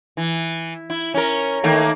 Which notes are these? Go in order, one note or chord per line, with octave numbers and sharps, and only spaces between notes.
E3
E4
C#4 A#4
D#3 A3 A#3